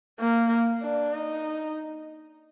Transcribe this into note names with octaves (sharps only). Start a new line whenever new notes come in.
A#3
D4
D#4